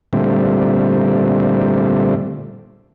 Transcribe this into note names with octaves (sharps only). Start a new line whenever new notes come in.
A#2 D3 G3 A3 C4